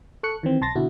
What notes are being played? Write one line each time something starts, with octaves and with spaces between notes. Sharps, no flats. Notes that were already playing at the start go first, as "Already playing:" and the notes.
A4 C#6 F#6 C#7
D#3 E3 C4
B1 A5 C6 A6 A#6
B2 D3 E4 F#4